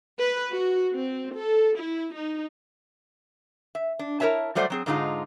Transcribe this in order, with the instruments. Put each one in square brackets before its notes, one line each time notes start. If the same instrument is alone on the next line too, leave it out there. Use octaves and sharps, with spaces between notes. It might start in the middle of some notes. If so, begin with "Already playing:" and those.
[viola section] B4
F#4
C4
A4
E4
D#4
[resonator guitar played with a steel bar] E5
D4
E4 A#4 B4 C#5 E5 A5
F#3 G3 A3 C5 D5 F#5
F#3 C4 G#4
G#2 D3 G#3 D#4 F4